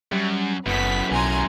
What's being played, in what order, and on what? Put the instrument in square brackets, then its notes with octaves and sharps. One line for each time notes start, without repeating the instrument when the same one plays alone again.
[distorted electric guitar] F#2 [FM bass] G3
[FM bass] F#1 [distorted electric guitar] F#2 A2 [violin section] B3 B6
[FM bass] B1 [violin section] G#5 A#5 C6